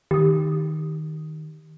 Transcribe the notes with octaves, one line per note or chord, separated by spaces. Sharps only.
D#3 G4 D#6